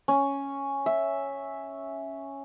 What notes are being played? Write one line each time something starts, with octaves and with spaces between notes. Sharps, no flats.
C#4
E5